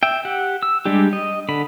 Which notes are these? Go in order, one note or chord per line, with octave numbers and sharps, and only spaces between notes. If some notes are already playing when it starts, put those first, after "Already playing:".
E5 G5
G4 F#5
E6
G3 G#3 D4 G4
D#5
D3 B5